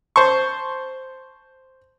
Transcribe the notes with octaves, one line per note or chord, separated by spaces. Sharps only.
C5 A5 C#6